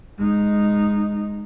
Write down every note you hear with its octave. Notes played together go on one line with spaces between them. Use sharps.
G#3 D#4